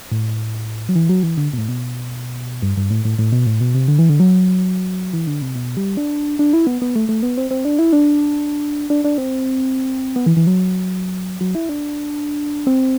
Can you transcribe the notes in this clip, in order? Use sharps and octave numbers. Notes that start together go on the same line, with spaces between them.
A2
F#3
E3
F#3
E3
D3
B2
A2
B2
G2
G2
A2
A2
A2
B2
A2
B2
C3
D3
E3
D3
F#3
E3
D3
C3
B2
G3
D4
D4
E4
B3
B3
A3
A3
B3
C4
C4
D4
E4
D4
D4
D4
C4
B3
E3
E3
F#3
F#3
E4
D4
C4